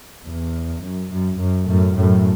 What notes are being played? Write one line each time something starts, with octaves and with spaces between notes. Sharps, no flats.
E2
F#2
F#2
F#2
F#2 A2
F#2 A2